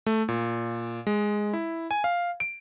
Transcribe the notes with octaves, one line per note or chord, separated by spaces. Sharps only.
A3
A#2
G#3
E4
G#5
F5
D7